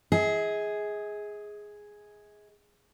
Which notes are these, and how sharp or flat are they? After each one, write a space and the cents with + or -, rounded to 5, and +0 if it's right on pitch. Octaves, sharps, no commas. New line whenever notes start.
G#4 +0 D#5 +45